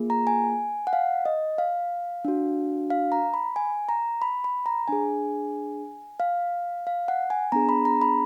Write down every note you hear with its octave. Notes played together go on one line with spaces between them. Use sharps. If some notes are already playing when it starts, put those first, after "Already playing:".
Already playing: A#3 F4 G#4
A#5
G#5
F#5
F5
D#5
F5
D4 F#4
F5
A#5
B5
G#5
A#5
B5
B5
A#5
D4 G#4 G#5
F5
F5
F#5
G#5
B3 D4 G#4 A#5
B5
A#5
B5